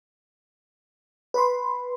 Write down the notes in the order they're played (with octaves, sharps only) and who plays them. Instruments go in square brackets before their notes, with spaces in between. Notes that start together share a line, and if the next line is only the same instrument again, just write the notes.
[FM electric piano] B4 B5 C6